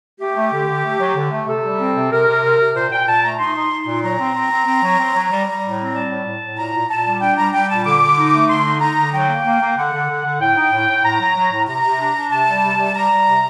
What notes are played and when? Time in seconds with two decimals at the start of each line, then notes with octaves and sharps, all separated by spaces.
0.20 A3 G4
0.36 A3
0.52 D3
0.68 D3
0.84 A3
1.00 F#3
1.16 D3
1.31 A3
1.48 C3 A4
1.63 G3
1.79 C4
1.95 C3
2.11 C3 A#4
2.28 C3
2.43 C3
2.60 C3
2.75 A#2 C5
2.91 A#2 G5
3.07 A#2 A5
3.23 A3 A#5
3.39 D#4 C6
3.55 D#4
3.71 D#4
3.87 A#2
4.03 F#3 A#5
4.19 C4
4.34 C4
4.50 C4
4.66 C4
4.82 F#3
4.98 C4
5.14 F#3
5.31 G3
5.47 G3
5.62 A2
5.78 C4
5.94 G3 A5
6.10 A2
6.26 A2
6.42 A2
6.57 A#2 A#5
6.74 A#2
6.89 A#2 A5
7.06 G3
7.21 D4 G5
7.37 G3 A#5
7.53 G3 G5
7.69 A#2 A5
7.85 D3 D6
8.01 D3
8.17 D#4
8.33 A3
8.49 D3 C6
8.65 D#4
8.81 D#4 A#5
8.97 D3
9.13 F#3 G5
9.29 A#3
9.45 A#3
9.60 A#3
9.77 D3 F#5
9.92 D3
10.09 D3
10.24 D3
10.40 A2 G5
10.56 D#4
10.72 A2
10.88 A2
11.04 A2 A#5
11.20 F#3
11.36 F#3
11.52 A2
11.68 C3 A#5
11.84 C3
12.00 D4
12.16 D4
12.32 C3 A5
12.48 G3
12.64 C3
12.79 G3
12.95 G3 A#5
13.11 G3
13.27 C3